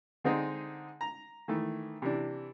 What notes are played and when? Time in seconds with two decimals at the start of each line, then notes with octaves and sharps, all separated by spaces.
0.24 D3 G#3 C4 D#4 G#4
1.01 A#5
1.48 D#3 E3 A3
2.02 C3 E3 D4